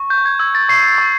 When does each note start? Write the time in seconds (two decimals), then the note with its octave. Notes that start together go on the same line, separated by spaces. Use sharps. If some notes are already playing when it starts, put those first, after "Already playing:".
Already playing: C#6
0.10 G6
0.25 G#6
0.40 E6 G#6
0.55 A6
0.69 C#6 C7
0.98 C#6